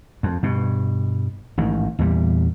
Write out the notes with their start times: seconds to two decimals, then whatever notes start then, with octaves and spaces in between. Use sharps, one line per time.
0.23 F2
0.43 G2 B2
1.58 A1 G#2 D#3
1.99 E2 A#2 G3